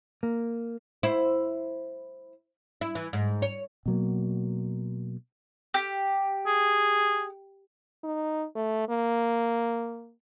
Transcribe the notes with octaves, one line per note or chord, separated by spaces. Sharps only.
A#3
E4 C5
E4
E3
G#2
C#5
B2 F#3 A#3
G4
G#4
D#4
A3
A#3